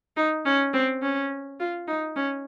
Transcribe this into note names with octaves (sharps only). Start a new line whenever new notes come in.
D#4
C#4
C4
C#4
F4
D#4
C#4